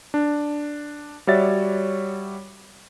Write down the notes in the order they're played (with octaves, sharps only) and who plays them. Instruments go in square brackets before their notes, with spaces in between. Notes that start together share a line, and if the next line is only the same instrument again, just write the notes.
[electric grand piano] D4
G3 F#4 C#5 D5 E5 A6